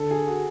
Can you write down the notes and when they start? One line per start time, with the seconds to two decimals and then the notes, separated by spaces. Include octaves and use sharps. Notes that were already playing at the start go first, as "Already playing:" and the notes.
Already playing: D3 A4
0.11 G#4
0.27 F#4